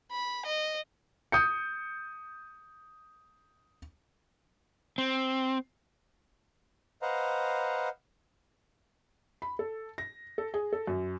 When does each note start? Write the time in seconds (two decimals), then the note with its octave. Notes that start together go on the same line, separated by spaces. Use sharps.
0.12 B5
0.46 D#5
1.32 D#6 G6 C#7
4.98 C4
7.02 B4 C5 D#5 F5 F#5 A#5
9.42 B5
9.59 A4
9.98 A#6
10.38 A4
10.54 G#4
10.73 A4
10.87 F#2